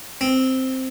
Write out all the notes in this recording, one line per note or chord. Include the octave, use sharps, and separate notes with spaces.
C4